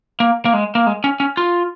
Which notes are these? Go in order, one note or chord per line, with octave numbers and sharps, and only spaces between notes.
A#3
A#3
G#3
A#3
G#3
C#4
C#4
F4